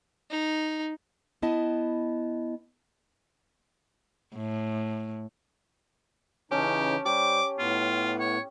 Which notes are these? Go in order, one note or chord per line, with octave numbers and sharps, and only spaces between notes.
D#4
B3 E4 D#5 A5
A2
C#3 E3 C#4 D#4 G4 C#5 A5
G3 G4 C5 D6
A2 B3 F4
C#5